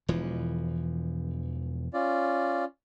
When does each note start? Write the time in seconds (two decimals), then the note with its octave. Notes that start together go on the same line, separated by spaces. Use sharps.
0.08 E1 E3 F3
1.93 C#4 F4 D5